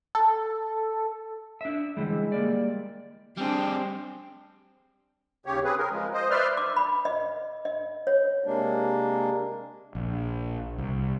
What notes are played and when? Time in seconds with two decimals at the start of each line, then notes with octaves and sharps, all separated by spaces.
0.15 A4
1.61 D4 E5
1.97 D3 E3 G3 G#3
2.32 G3 A#3 D5
3.38 G3 C4 D4 G#4 G5
5.46 D#2 C#3 G4 C#5
5.64 C4 G#4 B4
5.78 A#4
5.91 F3 G#3
6.14 C5 D#5
6.30 B4 C5 D5 E5 C6 F6
6.57 D6
6.77 B5
7.05 D#5
7.65 D#5
8.07 C#5
8.44 C3 G#3 A#3 D4
9.95 A#1
10.78 C2